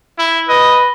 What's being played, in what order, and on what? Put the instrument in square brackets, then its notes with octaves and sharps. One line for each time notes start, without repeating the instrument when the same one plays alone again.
[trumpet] E4
[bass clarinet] B4 [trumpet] D#5